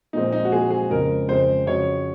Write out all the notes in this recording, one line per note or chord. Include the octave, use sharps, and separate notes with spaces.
A#2 F3 G#3 C4 D#4
D#4
F#4
A#2 F3 G#3 C4 G#4
G#4
F2 C#3 G#3 C4 A#4
F2 C#3 G#3 C4 C5
F2 C#3 F#3 C#5